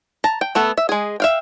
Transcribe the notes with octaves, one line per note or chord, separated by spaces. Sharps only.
A5 A#5
G5
A3 B3 A4
E5
G#3 G#4
E5 F5 G5